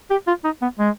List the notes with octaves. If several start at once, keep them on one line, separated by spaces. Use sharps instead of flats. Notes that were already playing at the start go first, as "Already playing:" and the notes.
G4
F4
D#4
B3
G#3